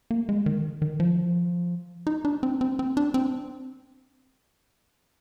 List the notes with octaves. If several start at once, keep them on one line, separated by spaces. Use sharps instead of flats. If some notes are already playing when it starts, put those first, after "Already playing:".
A#3
G#3
D#3
D#3
F3
D#4
D4
C4
C4
C4
D4
C4